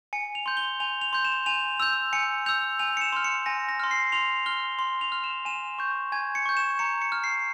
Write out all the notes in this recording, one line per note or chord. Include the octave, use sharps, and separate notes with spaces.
G#5 C#7
F7
C6 G6
G7
G#5 F7
F7
C6 G6
E7
G#5 F7
E6 G6 F7
G#5 C#7
E6 G6 F7
G#5 F7
C#7
E7
C6 F6
C#7
G#5 A#6
A#6
C6 F6
C7
C6 F7
F6 G7
C6
F7
F6
E7
G#5 E7
C#6 G6
G#5 G#6
C#7
C#6 G6
E7
A#5 C#7
C#7
F6
C7